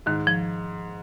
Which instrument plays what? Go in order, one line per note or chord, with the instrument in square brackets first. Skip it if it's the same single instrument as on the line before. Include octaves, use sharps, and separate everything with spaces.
[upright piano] G#2 [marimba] D#3
[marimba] F3